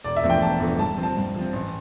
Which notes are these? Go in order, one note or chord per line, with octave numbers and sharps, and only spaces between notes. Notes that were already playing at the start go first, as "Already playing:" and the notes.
E1 D5
E5
E2 D3 F3 A3
G5
E1 A5
E2 D3 F3 A3
G2 A5
F3 C4
A5
G2
F3
C4
A1